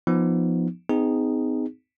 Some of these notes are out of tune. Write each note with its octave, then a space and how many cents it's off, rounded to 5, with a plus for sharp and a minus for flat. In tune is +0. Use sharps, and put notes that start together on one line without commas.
F3 +0 B3 +0 D#4 -5
C4 -45 D#4 +0 G#4 -10